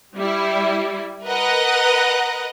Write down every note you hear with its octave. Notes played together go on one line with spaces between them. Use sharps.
G3 E4
A#4 B4 D#5 F#5